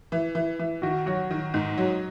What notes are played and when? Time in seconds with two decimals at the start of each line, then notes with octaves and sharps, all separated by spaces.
0.12 E3
0.35 E3
0.59 E3
0.82 D#3 F#4
1.06 F#3 F#4
1.31 D#3
1.54 G#2 D#4
1.78 F#3